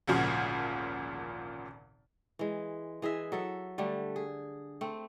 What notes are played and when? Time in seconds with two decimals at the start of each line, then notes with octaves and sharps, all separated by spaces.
0.07 G#1 D2 A#2 C#3 F3
2.39 E3 G#3
3.02 E3 G#4 D#5 E5
3.32 F#3 A4 E5
3.78 D3 G3 A3
4.16 G#4
4.81 A3 C4